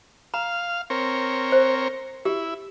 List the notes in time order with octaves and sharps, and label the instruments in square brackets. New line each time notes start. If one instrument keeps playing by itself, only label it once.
[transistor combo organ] F5 [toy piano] A#5
[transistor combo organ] C4 A#4 C#5
[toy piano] C5
[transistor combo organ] E4 [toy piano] G4